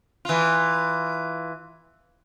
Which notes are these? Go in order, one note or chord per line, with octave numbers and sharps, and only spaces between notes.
E3 F4